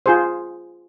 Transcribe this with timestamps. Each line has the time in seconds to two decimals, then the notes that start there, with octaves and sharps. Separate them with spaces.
0.06 F4 G#4 C5